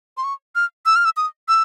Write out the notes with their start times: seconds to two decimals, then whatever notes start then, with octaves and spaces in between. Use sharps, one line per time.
0.17 C6
0.24 C#6
0.55 F6
0.86 E6
0.96 F6
1.05 E6
1.17 D#6
1.48 E6